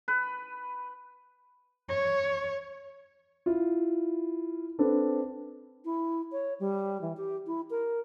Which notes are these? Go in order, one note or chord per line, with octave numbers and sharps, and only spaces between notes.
B4
C#5
E4 F4
C4 D4 A4 B4 C5
E4
C#5
G3
E3
G4
E4
A#4